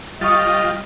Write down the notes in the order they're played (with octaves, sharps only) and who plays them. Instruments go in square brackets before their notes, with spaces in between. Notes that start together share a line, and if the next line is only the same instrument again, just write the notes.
[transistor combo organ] G3 F4 [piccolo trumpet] D#5 [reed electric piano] C#6 D#6 A6